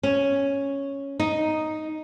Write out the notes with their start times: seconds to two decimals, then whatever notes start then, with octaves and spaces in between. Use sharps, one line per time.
0.03 C#4
1.20 D#4